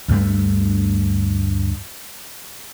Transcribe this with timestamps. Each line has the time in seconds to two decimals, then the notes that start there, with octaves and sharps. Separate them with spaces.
0.08 D2 G2 A3